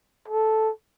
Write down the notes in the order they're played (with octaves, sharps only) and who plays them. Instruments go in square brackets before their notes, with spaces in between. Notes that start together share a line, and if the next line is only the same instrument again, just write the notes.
[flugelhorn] A4